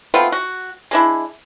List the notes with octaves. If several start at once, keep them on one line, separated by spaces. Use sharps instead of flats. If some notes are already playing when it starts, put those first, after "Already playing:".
A3 B3 C4 F4
F#4
G#3 D4 E4